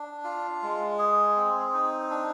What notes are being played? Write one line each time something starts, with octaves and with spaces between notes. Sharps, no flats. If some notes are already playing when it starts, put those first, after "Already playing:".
Already playing: D4
F4
G#3
G#4
C4
D#4
D4